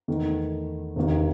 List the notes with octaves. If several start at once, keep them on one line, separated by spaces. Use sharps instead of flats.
E2 D#3 A3
E1 D#2 D#3